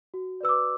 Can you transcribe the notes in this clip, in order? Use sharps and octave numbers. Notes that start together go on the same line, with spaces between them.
F#4
B4 D5 E6
D6